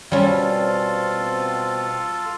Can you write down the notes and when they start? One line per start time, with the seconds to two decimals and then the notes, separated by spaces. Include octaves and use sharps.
0.12 B2 G3 C4 C#4 F4 A4 F5